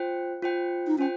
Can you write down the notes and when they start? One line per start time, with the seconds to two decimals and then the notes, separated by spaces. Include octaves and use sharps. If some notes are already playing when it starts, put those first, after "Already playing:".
Already playing: F4 C5 G5
0.42 F4 C5 G5
0.87 D#4
0.98 C#4 F4 C5 G5